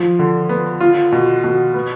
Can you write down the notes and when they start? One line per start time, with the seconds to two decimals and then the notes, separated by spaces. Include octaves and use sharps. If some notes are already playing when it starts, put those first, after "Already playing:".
Already playing: F3
0.19 D3
0.49 B3
0.80 F4
1.12 B2
1.44 B2
1.74 B3